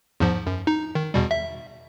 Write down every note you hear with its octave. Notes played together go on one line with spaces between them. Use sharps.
E2 G#2 F3
F#2
D#4
D#3
E2 B2 G3
E5